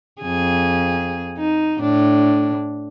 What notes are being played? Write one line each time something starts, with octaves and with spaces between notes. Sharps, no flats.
F2 G#4
D#4
A2 D4